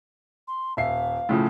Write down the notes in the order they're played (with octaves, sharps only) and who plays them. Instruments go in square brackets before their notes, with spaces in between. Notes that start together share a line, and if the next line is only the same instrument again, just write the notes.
[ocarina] C6
[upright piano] D#1 E5 C7 [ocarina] F5
[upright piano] A2 C#3 F3